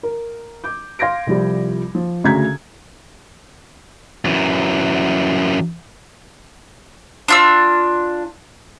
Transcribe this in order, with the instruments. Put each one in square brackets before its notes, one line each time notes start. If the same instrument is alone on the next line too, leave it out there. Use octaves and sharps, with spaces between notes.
[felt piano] A#4
D6 G6
F5 C6 G#6 A#6 D7
C2 F3 G3
F3
D2 C#3 F#4 A#5 G#6 B6
[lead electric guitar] F#2 E3
[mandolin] D4 F4 E6